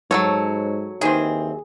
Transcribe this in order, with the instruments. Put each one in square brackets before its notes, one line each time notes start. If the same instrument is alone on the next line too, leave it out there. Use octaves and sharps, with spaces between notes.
[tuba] G#2 [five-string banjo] F#3 C#4 C#5 [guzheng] A4
[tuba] D#2 [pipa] D#3 E3 C4 [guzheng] G#4